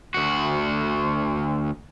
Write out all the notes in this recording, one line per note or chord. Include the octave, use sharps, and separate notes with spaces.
D2 F#4